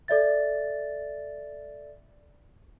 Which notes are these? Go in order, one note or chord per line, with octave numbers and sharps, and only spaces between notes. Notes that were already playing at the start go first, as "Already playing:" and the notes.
A4 D5 E5 A6